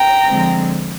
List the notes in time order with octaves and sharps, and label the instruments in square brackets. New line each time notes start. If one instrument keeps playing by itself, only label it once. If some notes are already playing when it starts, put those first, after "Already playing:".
Already playing: [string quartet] G5 A#5
D3 F3 G#3 C4